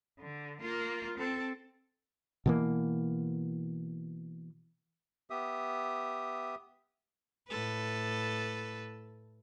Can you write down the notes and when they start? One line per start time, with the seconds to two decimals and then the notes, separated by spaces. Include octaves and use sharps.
0.19 D3
0.62 A#3 F4
1.18 C4 A4
2.46 B2 E3 A#3
5.30 B3 G4 E5 D#6
7.49 A2 A4 B4